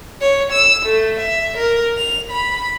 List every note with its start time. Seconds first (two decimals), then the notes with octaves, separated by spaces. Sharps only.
0.21 C#5
0.52 E6
0.86 A3
1.18 E5
1.58 A#4
1.98 F7
2.31 B5